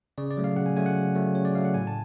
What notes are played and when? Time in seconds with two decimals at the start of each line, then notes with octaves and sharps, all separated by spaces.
0.18 C#3 D5
0.31 D5
0.37 F#3 A3
0.44 F5
0.56 C#3 F#5
0.66 G#5
0.76 F#3 A3 G#5
0.86 F#5
0.96 C#3
1.15 F#3 A3
1.35 C#3 C#5
1.45 D5
1.55 F#3 A3 F5
1.65 F#5
1.74 A2 G#5
1.87 A5